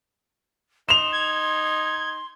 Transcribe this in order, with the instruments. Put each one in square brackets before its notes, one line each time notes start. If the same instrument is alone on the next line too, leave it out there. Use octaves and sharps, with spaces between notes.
[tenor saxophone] D#4 [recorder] C6 [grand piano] E7 F7
[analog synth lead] G#6